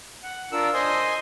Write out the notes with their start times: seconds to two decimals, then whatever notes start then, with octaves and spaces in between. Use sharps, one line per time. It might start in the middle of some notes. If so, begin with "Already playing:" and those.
0.23 F#5
0.52 D4 F4 A#4 E6
0.74 C5 D#5 G#5 C6 D#6